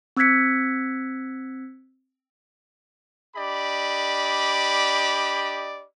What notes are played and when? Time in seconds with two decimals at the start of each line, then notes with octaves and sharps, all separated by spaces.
0.17 C4 E6 F#6 G#6 B6 C#7
3.35 D4 G4 D5 D#5 B5